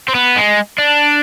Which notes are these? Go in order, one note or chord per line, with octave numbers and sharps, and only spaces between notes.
C4
B3
G#3
D4